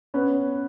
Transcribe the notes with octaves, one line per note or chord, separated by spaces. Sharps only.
B3 C#4